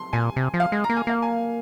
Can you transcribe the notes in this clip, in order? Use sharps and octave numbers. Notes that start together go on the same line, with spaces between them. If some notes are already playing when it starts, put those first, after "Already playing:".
Already playing: C6
A#2 G#5
C3
F3
F5
G#3
A#5
A#3
G#5
A#3 F5
G#5